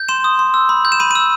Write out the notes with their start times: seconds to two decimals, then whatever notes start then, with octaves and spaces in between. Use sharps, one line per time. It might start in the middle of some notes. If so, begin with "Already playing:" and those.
Already playing: G6
0.09 C6 E7
0.24 D#6
0.39 C6
0.54 E6
0.69 B5
0.85 G6
0.92 E7
1.00 B5 D#7
1.11 D#7
1.15 E6